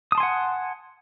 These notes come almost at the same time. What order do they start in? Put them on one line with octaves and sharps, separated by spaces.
D#6 A5 C6 G#5 F#5